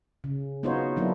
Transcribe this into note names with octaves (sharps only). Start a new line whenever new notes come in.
C#3
B3 D#4 F4 F#4 C5 C#5
D3 F#3 A#3 B3 D4 E4